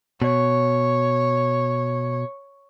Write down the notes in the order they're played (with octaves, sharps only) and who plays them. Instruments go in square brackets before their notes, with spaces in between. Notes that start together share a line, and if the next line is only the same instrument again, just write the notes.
[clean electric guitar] B2 [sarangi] C#5